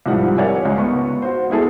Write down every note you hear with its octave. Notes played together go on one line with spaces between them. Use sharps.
C2 G#2 F3 G3 F#5
A#4 C#5 D5 E5 F#5 G#5
C#2
B3 C#6
F#4 C5
B3 E4 G#4 A4